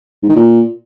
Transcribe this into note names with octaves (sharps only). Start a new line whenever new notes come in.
G#2
D#3
A#2